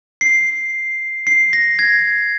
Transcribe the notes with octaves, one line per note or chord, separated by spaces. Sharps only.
C7
C7
A#6
G#6